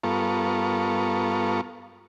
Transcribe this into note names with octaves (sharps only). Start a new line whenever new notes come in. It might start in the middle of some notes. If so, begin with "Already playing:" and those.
G2 B3 F4 A4 A#4 C#6